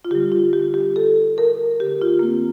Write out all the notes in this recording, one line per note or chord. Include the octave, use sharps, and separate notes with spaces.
F4
D3 G3 G4
F4
G4
G4
A4
A#4
D3 A3 G4
F4
A#3
C4